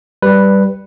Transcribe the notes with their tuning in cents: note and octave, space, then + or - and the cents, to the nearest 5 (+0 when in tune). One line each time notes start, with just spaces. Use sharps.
G3 +0 B4 +0